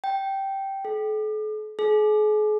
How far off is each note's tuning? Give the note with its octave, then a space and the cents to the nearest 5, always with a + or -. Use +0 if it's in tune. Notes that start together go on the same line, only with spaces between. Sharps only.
G5 -10
A4 -45
G#4 +40